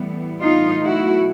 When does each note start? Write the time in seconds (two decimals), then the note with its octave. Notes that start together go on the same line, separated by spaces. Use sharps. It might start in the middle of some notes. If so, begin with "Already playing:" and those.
Already playing: A2 E3 G3 B3
0.41 D#4 F4
0.83 B2 F#3 A3 E4 F#4